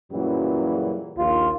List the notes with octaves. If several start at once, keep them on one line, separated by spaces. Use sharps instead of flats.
F#2 A#2 C#3 E3 F#3 G3
A#1 D#2 F4